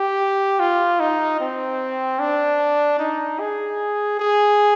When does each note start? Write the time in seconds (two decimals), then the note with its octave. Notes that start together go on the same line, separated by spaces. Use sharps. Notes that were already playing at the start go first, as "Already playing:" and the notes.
Already playing: G4
0.60 F4
1.00 D#4
1.40 C4
2.19 D4
2.99 D#4
3.40 G#4
4.20 G#4